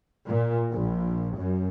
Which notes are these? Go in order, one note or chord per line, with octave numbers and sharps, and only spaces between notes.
A#2
A#1
F#2